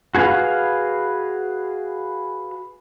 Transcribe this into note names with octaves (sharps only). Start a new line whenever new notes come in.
F#4 G#4 A#4 B4 F5